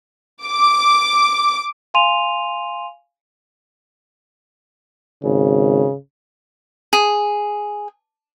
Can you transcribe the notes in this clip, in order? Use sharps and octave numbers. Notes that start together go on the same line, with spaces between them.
D6
F5 G#5 C6 D#7 F7
G#1 C#3
G#4